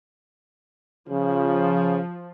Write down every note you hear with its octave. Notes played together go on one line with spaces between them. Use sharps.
C#3 F3